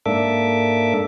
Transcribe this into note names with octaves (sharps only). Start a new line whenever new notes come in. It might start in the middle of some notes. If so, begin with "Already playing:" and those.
G#2 A#3 D4 A4 E5 D6